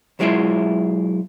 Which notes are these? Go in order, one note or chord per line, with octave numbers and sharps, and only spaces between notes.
B1 F#3 G#3 E4 F4 E5